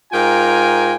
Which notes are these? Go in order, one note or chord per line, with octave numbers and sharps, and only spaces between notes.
G#2 F4 A#4 G5 G#5